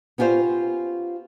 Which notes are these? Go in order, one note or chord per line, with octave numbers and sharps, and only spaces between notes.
B3 C#4 F4 G4 C5